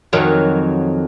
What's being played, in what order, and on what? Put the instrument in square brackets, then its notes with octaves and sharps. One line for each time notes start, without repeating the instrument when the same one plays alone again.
[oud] F2 D#3 F#3